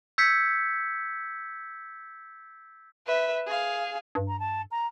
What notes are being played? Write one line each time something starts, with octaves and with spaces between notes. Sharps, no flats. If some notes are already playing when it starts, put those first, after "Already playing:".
E6 G6 G#6 B6 C#7
B4 E5
G#4 F5
G2
A#5
A5
A#5